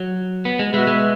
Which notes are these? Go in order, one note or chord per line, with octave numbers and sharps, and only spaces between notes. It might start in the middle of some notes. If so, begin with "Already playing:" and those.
Already playing: F#3
B3
G#3
B2 G#3 B3 F#4 B4 E5
G#3